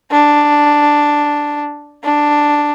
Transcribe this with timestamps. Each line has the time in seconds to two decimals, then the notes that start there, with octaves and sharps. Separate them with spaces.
0.11 D4
2.04 D4